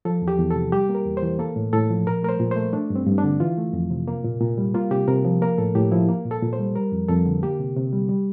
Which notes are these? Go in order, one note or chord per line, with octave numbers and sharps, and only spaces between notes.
F3 A4
E2
G4
E2
A4
C3
G3 G4
A#3
A#4
E2
C5
E3
A#3 A4
A2
A2 A4
F3
A#2 A#4
A3 A#4
C5
A#2
C5
A3
A3 D4
G2
C4
G2
D4
D3
E3 F4
A3
F2
C3
A#3
A#2
A#2
G3
A#3 F4
C3 G4
C3 A#4
F3
A#3 A#4
A2 A4
A2 G4
F3 E4
A#3
A#2
A4
A#2
C5
G3
G3 A#4
F2
F2 A4
D3
A#3 G4
C3
C3
G3
G3